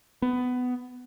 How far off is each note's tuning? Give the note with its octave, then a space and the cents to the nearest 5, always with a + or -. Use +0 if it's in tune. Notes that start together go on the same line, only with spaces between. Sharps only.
B3 +15